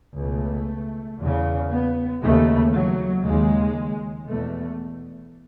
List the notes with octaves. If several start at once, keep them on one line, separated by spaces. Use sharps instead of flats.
C#2 B2 A3
E2 C#3
B3
D#2 C#3 A3
F#3
D#2 C#3 G#3
E2 B2 A3